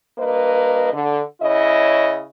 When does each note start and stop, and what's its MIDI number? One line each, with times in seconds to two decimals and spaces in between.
0.18 0.89 43
0.18 0.89 58
0.18 0.89 71
0.18 0.89 75
0.92 1.22 50
1.41 2.25 49
1.41 2.25 64
1.41 2.25 73
1.41 2.25 75